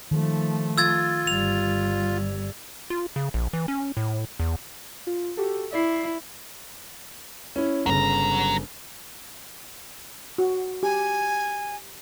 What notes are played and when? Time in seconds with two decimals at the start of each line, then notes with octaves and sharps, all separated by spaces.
0.11 D#3 F3 A3
0.78 F4 E6 G#6 A6
1.27 G1 G3 F7
2.90 F4
3.16 C#3
3.34 A#1
3.53 E3
3.68 C#4
3.97 A2
4.40 E2
5.07 F4
5.37 F#4 G4 A4
5.73 E4 D5 C7
7.56 C#4 E4
7.86 G1 C#3 F#3 A#5
10.38 F#4
10.83 G4 G#5